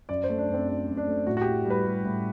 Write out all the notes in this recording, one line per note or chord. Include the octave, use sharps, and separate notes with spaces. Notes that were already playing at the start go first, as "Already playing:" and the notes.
F#2 D5
C5
A3
D4
F#2
C4
F#3 D4
F#2
D4
A3
A2 F#4
F#4
A2 G4
G3 B4
G3
A2